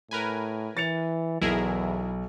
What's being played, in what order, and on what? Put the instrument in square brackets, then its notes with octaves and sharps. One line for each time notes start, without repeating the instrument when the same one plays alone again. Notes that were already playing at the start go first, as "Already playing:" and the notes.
[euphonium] A2 [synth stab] A#4 B4 G#5
[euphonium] E3 [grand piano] A6 C#7 F7
[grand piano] B1 [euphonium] E2 [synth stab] E4 G#4 A#4